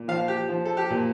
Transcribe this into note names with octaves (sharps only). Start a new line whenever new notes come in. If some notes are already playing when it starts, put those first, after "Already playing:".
Already playing: A#2
F3 F5
G4
F3
A4
G4
A#2